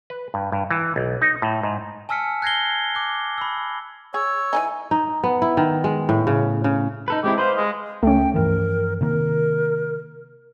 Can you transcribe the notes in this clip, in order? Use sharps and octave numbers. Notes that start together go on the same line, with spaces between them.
B4
G2
G2
E3
B1
D#4
A2
G#2
G#5 A5 E6 F6 B6 C#7
F#6 G#6 A#6 C7 G7
D6 F#6
B5 E6
G#4 C#5 E6
E3 D4 D#4 G#5
D#4
B3
E4
D#3
G#3
A2
C#3
C#3
D#4 A4 B4
G#3 C4 E4 G4
B4 C5 D#5 F5
G#3
C#2 A3 C#4 G5
G2 E3 F3 A#4
C3 D#3 A#3 A#4